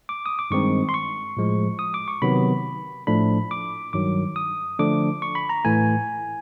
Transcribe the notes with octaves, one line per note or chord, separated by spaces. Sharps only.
D6
D#6
D6
G2 D#3 G#3 C4 D#4 C#6
C6
C#6
A2 F3 G#3
D#6
D6
C#6
C3 D#3 F#3 B3 B5
A2 F3 A3 D4 B5
D6
G2 D#3 F#3 D6
D#6
D3 F3 A3 D4 D6
C#6
B5
A#5
A2 E3 A3 G#5